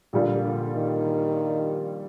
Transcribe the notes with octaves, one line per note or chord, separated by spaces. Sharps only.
A#1 A#2 D3 G3 A#3 F4
D3
D#3